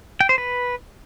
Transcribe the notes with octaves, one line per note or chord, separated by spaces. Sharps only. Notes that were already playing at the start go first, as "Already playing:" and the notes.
G5
C5
B4